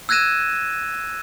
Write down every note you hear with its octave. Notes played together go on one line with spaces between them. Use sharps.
E6 F#6 G#6 A#6 D#7 E7